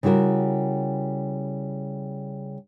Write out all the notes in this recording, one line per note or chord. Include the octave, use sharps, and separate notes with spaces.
C#3 G3 E4 F#4 A#4